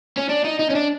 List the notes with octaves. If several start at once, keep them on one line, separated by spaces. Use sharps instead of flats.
C#4
D4
D#4
D#4
C#4
D4